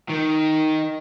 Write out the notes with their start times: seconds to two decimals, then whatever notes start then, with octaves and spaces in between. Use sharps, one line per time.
0.09 D#3